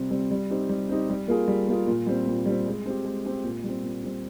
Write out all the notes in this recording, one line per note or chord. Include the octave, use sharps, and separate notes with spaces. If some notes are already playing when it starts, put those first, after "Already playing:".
Already playing: C3 G3 C4
G3 C4
G3
C4 D#4 G4
G3
C4 D#4 G4
G3
A#3 F4 G#4
G3
A#3 F4 G#4
A#2
G3 C4
A#2
G3 C4
G#3
C4 G4
G#3
C4 G4
A#2
G3 C4
A#2
G3 C4